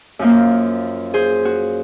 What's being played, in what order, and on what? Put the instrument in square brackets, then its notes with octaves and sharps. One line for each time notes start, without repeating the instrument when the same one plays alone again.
[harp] F#2 F3 A#3
G#4 C5
F#4